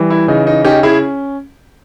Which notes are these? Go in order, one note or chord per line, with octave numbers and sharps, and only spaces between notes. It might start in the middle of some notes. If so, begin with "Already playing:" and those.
Already playing: E3 G3
E4
C#3 D#4
D#4
C#4 D#4 G4
E4 G#4